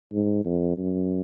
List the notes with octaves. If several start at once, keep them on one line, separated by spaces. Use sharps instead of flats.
G#2
F2
F#2